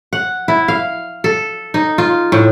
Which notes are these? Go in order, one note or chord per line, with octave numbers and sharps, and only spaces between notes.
F#5
E4
F5
A4
D#4
F4
A2